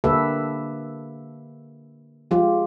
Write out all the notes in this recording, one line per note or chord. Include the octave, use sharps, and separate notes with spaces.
D3 A#3 G4 A4 B4 E5
F3 G#3 F4 G4